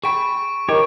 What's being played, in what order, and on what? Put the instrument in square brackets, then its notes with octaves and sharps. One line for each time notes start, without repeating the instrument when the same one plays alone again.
[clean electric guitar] G#4 G5 B5 [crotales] C#6 D7
[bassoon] D#3 [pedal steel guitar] G4 C#5